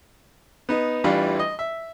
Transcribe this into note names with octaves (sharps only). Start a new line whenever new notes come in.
B3 D#4
A1 E3 G3 D4 E4 F4
D#5
E5